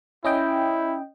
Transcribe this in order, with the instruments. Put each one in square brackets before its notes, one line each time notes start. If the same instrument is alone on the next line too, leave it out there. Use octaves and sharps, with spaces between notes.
[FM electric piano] C#4 D#5 G5 [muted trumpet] E4